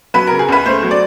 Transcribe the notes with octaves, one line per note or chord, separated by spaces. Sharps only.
F#3 B4
C#3 A#4
G#4
C#2 B4
A3 C5
F#3
D5